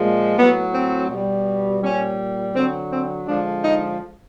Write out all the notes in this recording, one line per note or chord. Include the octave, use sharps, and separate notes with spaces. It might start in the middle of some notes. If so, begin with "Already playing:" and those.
Already playing: A#2 F3 G#3
A2 F#3 B3
C4
B2 G3
A#2 G3 C#4
D3 F#3 C4
C4
D3 F3 G#3 D4
D#4